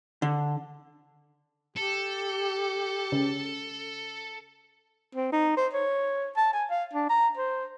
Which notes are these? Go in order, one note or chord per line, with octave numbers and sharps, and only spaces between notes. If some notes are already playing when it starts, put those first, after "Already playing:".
D3
G4 A4
C#3
C4
D#4
C5
C#5
A5
G#5
F5
D4
A#5
C5